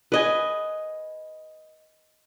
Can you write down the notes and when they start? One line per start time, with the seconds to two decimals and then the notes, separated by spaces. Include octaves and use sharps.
0.12 B4 D#5 G#5